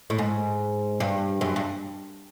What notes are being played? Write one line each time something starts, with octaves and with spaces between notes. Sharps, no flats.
A2
G#2
G2
F#2
G2